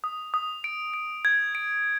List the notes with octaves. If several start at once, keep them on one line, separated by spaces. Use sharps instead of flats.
D#6
D#6
D7
D7
G#6
D7